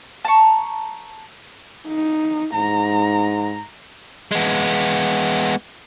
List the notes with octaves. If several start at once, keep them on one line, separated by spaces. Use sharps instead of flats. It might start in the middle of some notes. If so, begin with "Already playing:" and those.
A5 A#5 C#6
D#4
G#2 A#5
G#3 B3